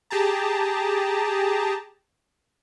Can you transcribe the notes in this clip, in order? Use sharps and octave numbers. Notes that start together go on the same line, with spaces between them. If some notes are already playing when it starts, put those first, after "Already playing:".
G4 G#4 A5 A#5